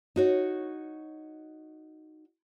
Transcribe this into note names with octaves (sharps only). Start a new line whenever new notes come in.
D#4 F#4 C#5